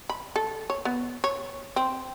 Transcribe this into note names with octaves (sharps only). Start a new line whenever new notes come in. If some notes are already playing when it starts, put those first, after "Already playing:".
B5
A4
C#5
B3
C#5
C4